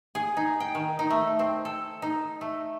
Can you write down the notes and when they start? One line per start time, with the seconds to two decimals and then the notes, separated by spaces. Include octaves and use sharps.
0.15 G#4
0.37 D#4
0.60 G5
0.75 D#3
0.99 D#4
1.10 A3
1.39 C4
1.65 A4
2.02 D#4
2.41 A3